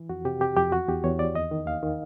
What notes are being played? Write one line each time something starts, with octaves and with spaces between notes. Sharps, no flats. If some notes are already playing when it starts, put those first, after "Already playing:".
Already playing: E3
F2 F#4
C3 G4
C3 G4
F2 G4
E2 F#4
E2 G4
E2 C#5
E2 D5
D#2 D#5
D#3
D#2 F5
D#3